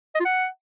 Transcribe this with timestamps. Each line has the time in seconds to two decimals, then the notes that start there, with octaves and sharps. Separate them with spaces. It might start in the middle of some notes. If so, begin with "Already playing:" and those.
0.15 D#5
0.20 F4
0.25 F#5